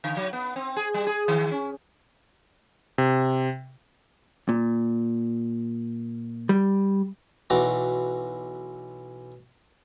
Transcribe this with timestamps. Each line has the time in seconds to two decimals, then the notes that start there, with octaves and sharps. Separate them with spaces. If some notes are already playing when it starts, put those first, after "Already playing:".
0.04 D3
0.17 F#3
0.33 B3
0.56 C4
0.76 G#4
0.94 G3
1.07 G#4
1.28 D#3
1.51 C#4
2.98 C3
4.49 A#2
6.49 G3
7.50 B1 E3 F#4 B4 A#5 D6